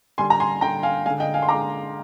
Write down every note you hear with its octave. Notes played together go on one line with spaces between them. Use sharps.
D3 G3 G#5 C6
A#5
G#5 C6
D3 G3 G5 A#5
F5 G#5
D3 G#3 F5 G#5
D#5 G5
F5 G#5
C6
D3 G#3 A#5 D6